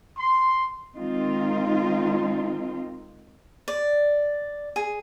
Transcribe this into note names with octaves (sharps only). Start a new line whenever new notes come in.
C6
D#3 G#3 C4 D#4 F4
D5
G#4